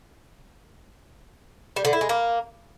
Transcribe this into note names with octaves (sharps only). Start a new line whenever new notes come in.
G3
D3
E4
G#3
A#3